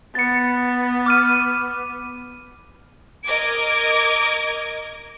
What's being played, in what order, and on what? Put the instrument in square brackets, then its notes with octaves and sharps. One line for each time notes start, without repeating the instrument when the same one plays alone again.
[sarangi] B3 [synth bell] A6 C#7
[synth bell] D6 F6 D#7
[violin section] A#4 D#5 D6 G#6 D7